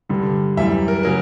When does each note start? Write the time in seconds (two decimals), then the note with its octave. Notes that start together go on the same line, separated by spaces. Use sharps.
0.09 G2 D3 G3
0.57 F#2 E3 G3 E5
0.88 A#4
1.03 C#3 F#3 A#4